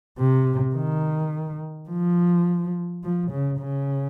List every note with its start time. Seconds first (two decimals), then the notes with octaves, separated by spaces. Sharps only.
0.18 C3
0.75 D#3
1.90 F3
3.04 F3
3.31 C#3
3.59 C#3